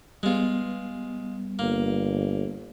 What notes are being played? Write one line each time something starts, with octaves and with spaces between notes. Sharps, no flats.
G3 G#3 B3 F4
G1 A#3